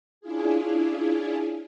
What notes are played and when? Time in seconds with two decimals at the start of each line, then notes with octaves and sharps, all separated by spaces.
0.21 C#4 D4 E4 F4 G#4